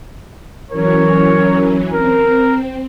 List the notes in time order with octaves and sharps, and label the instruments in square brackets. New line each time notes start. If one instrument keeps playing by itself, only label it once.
[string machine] E3 F#3 C#4 [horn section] A#4 C#5
[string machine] C4 [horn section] A#4